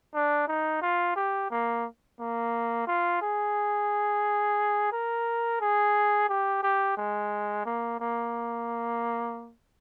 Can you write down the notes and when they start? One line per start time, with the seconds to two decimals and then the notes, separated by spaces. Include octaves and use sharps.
0.14 D4
0.48 D#4
0.82 F4
1.16 G4
1.50 A#3
2.19 A#3
2.87 F4
3.22 G#4
4.92 A#4
5.61 G#4
6.29 G4
6.63 G4
6.97 G#3
7.65 A#3
8.00 A#3